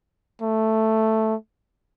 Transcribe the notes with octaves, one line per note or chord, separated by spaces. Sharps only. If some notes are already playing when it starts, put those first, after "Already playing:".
A3